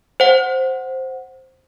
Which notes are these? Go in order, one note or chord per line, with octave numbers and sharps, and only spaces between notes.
C5 F#5